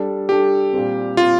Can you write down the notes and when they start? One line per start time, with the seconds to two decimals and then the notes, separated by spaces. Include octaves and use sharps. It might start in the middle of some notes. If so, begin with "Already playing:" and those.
Already playing: G3 D4 A4
0.29 G3 D4 G4 A4
0.73 A#2 G3 C4
1.17 A#2 G3 C4 F4